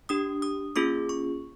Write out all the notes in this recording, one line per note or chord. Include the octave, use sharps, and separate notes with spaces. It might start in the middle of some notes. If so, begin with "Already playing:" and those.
D4 G4 D#6
D#6
A#3 C#4 F4 G#4 D6
C#6